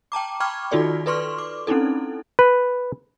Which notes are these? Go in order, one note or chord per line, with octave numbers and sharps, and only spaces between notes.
G5 A5 A#5 D6
G5 B5 C#6 D6 F6 G#6
D#3 D#4 F4 F#4 A4 D5
A4 B4 D5 C6 C#6 F6
D6
C4 C#4 D#4 E4 A4
B4